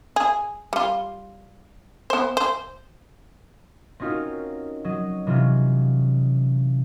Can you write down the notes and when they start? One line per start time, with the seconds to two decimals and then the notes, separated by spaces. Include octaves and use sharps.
0.16 G#4
0.73 G3 F4
2.10 B3 C5
2.37 C5
4.00 C4 C#4 D#4 F4 F#4 A#4
4.84 F#3 D#5
5.27 C3 E3 F#3 C#4 F4